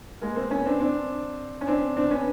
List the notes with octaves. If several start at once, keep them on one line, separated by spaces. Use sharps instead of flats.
G#3 A#3
A#3 C4
B3 C#4
C4 D4
C4 D4
C#4
C4 D4
C4 D4
B3 C#4